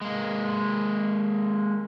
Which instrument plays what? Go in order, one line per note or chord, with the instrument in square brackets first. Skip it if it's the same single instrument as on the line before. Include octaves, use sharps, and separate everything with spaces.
[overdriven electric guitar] G#3 A#3